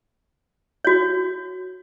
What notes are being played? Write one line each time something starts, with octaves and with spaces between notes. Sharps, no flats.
F#4 C#5